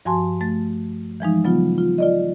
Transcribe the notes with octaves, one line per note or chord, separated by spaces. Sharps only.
G2 F3 F#4 G#5 A5 C6
A3 A6
E3 F3 G#3 D#4
C#3 F#3 B3 F4
F4
F4 D5 D#5